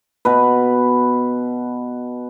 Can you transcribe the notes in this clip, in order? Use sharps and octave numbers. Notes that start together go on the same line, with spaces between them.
B2 B4